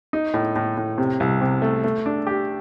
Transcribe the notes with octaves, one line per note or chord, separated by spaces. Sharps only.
D#4
A2
A2
A2
C3
C2
C3
A3
A3
D4
G4